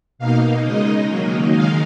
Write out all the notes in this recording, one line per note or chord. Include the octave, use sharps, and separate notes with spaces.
B2 A#3 D#4 F5
C#3 G#3 D#4 D#5
D#3 F#3 A#3 D#4
D#3 G#3 D#4 F5